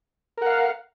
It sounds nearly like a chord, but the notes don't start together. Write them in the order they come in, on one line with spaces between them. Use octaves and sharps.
A#4 F#5 F5